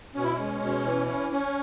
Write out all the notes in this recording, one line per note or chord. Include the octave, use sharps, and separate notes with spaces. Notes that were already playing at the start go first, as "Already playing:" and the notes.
B2 C#4
E4
G#3 C#4
B2
E3
C#4
C#4